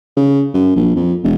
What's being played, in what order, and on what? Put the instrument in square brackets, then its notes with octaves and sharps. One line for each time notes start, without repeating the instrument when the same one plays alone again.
[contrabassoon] C#3
F#2
A#1
F2
E1